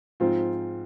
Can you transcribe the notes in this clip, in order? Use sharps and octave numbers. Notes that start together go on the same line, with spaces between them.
G#2 F3 C4 F4